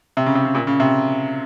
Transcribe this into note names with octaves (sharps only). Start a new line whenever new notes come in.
C3
C#3
C3
C#3
A#2
C#3
C3